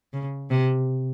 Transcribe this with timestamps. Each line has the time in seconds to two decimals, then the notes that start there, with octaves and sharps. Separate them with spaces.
0.13 C#3
0.50 C3